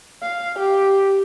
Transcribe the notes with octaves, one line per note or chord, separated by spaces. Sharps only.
F5
G4